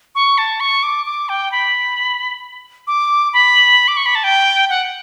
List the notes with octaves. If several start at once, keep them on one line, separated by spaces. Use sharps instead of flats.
C#6
A5
C#6
D6
D6
G5
B5
D6
B5
D6
C#6
B5
A5
G5
F#5